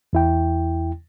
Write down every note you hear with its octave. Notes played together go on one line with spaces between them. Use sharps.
E2 E4 G5